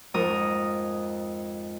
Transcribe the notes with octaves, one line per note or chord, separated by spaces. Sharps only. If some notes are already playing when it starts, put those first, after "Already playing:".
F2 G#2 A#4 D#6